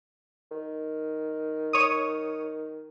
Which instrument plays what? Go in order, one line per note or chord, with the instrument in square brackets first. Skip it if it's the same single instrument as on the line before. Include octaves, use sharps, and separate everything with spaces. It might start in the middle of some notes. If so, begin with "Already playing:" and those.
[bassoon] D#3
[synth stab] C#5 D#6